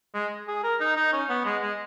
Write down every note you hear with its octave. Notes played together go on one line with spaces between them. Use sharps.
G#3
G#4
A#4
D#4
D#4
C#4
B3
G#3
G#3